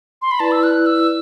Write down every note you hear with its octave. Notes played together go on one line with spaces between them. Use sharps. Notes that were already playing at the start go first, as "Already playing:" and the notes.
C6
B5
E4 B4 D5 A5
E6
F#6
E6